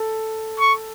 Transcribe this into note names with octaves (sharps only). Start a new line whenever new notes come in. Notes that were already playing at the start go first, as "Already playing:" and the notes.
Already playing: A4
C#6